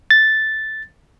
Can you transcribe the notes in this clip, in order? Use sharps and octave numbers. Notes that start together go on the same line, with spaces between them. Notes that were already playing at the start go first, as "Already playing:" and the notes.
A6